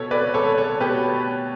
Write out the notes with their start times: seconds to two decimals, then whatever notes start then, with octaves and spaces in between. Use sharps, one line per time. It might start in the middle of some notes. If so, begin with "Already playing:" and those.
Already playing: B2 A4 C#5
0.11 B4 D5
0.34 A4 C#5
0.58 A4 C#5
0.80 B2 G4 B4